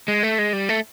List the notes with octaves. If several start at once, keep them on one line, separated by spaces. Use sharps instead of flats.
G#3
A3
G#3
G3
A3